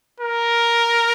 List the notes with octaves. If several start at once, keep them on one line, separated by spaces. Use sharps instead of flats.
A#4